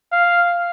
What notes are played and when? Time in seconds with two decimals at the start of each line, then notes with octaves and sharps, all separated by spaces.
0.12 F5